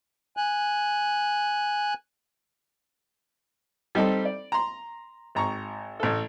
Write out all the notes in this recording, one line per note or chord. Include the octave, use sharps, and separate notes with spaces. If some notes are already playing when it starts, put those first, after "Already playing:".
G#5 F#6
G3 C4 D#4 A4
D5
A#5 C6
G#1 A#5 C#6
A1 A4